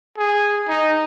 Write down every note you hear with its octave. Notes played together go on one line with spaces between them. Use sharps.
G#4
D#4